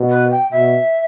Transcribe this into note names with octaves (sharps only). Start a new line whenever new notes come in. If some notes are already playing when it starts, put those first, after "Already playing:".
Already playing: B2
B4
G5
B2 E5